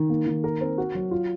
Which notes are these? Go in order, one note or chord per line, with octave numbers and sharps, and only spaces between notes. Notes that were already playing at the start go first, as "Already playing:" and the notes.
Already playing: D#3
A#3
D#3
A#4
C4
F#4
F#3
F4